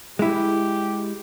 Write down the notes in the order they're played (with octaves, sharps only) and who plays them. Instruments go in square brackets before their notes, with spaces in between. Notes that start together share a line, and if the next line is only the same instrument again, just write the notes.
[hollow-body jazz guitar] G#3 E4 [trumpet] G4